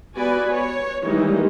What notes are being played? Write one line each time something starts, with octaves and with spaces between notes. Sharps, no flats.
B3 F#4 B4 D5 G#5
C#5
D#3 E3 G3 G#3 A#3 D#4